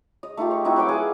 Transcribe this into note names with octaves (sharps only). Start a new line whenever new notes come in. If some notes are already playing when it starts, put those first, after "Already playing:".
D#5
A3 D#4 F4 G4
C#6
C4 D#4 E4 F#4
F#3 B4 G5 D6
G#4 F5 F#5